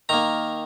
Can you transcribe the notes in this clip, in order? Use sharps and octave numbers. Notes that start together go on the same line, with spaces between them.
D#3 A#3 A#5